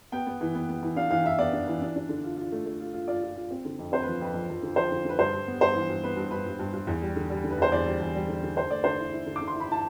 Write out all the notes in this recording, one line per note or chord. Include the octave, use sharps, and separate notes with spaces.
B3 G5
B3
E3
B3
B3
E3
D4 F5
E3 F5
E3 E5
B3 D5
D4
E3
D4
D4
D3
F4
F4
A3
A3
F4
F4
F4 D5
F4
F4
C4
D3
F2
C4 C5
F3 B4
F2 B4
F3
F3
D3
F3 C5
D3
D3 B4
G2 C5
G2
B3
G2 C5
E3
G2
B3 B4
G2
G2 B4
G2
G2
G2
E2
G3
D3
G3
D3
B4
E2 C5
E2 D5
G3
E2
G3
D3
D3
D3 C5
A3 D5
D3 C5
E4
E4
D3
D6
D3
C6
E4
B5
E4 A5